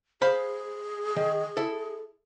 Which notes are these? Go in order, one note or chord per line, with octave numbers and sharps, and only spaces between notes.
G#4 C5 F5 B5
D#3
E4 A4